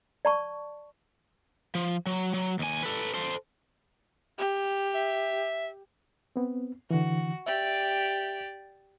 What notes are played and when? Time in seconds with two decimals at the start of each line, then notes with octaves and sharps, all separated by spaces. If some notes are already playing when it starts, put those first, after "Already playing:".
0.25 D5 A5 C#6
1.75 F3
2.06 F#3
2.34 F#3
2.59 D#2 G#5
2.83 A4 B4
3.14 A4 C5
4.39 G4
4.95 E5
6.36 B3 C4
6.91 D3 E3 F#4
7.46 G4 D5 E5